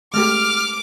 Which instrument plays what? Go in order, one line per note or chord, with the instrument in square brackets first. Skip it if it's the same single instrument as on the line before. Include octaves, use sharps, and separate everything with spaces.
[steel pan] G#3 A3 G4 [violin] D6 [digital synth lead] F6